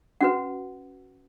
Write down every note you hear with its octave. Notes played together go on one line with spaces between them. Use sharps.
C#4 F#4 B4 F#5